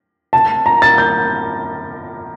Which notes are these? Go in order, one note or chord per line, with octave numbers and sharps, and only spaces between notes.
A5
A#5
A6
G6